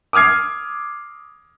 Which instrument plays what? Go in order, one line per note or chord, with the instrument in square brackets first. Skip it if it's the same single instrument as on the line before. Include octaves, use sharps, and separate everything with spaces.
[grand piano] D6 D#6 F6 G#6 C7